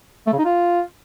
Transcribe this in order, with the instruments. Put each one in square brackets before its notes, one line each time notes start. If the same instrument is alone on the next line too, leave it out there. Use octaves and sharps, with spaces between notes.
[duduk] A3
C#3
D#4
F4